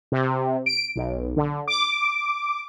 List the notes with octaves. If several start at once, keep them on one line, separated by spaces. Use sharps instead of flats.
C3
D7
B1
D3
D6